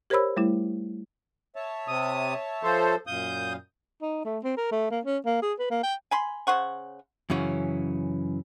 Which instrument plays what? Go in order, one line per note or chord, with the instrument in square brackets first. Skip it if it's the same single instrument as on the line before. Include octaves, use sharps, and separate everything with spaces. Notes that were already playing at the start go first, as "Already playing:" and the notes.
[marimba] G4 A#4 C5 C#5 B5 E6
G3 A3 E4
[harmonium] C#5 E5 A5
[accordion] C3 D#6
F3 A4 C5
[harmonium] F#2 A#2 F5 [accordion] D#6 G6
[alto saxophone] D#4
A3
C4
A#4
A3
A#3
C#4
A#3
G#4
B4
A#3
G5
[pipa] G#5 B5 C6
C#3 C5 F#5 C#6
[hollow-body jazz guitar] F#2 C#3 E3 C#4